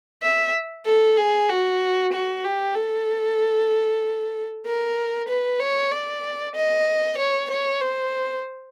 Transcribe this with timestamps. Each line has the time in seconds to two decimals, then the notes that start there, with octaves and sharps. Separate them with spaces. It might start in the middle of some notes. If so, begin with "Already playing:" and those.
0.23 E5
0.85 A4
1.17 G#4
1.49 F#4
2.13 F#4
2.44 G4
2.75 A4
4.65 A#4
5.28 B4
5.60 C#5
5.91 D5
6.55 D#5
7.18 C#5
7.50 C#5
7.81 C5